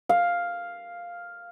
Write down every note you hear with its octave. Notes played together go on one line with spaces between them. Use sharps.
F5